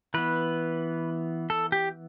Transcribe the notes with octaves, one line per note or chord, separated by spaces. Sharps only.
E3 B3 B4
A4
G4